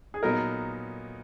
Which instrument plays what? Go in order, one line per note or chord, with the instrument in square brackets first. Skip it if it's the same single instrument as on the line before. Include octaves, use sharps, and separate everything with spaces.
[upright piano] G#4
[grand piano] A#2 F#3 B3 D#4 [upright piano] A#4